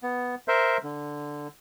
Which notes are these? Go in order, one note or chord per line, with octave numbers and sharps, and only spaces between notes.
B3
A#4 C5 E5
D3